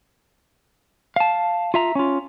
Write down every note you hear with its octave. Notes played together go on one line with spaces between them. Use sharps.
F5 A5
F4 E5 A#5
C#4 F4